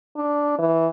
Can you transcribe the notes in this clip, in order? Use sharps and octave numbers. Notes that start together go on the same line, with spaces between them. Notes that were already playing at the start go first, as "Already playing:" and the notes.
D4
E3